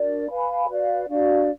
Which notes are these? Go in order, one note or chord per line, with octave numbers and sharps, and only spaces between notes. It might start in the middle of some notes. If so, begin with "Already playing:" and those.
Already playing: D4 F#4 A#4 D5
B4 F5 G#5 B5
F#4 B4 D5 F5
D4 F#4 D5 F5